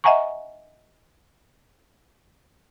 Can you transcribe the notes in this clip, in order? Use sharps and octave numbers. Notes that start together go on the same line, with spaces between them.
D#5 E5 F#5 G#5 A#5 C#6